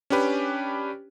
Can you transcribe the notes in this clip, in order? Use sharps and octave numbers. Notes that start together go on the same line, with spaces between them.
C#4 D4 G4 B4